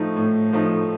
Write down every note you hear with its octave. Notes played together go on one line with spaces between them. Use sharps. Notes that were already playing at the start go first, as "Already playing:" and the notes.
Already playing: A2 F3 A3 D#4
A2
F3 A3 D#4